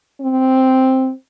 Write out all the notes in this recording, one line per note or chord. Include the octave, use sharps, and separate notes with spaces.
C4